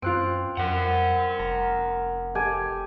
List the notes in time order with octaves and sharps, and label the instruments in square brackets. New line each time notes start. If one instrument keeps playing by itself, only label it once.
[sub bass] F#2 [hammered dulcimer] C4 [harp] F4 F#6 D7
[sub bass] F2 [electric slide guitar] A#4 F#5
[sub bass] F1 [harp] A#5
[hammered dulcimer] G4 A4 G#5